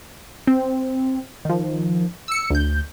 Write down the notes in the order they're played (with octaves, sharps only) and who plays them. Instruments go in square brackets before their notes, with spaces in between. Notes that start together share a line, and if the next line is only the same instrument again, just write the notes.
[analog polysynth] C4
D#3 F3
E6 C#7
D2 G6